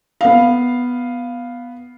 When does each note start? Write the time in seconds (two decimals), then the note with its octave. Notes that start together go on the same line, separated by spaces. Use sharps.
0.21 B3 F5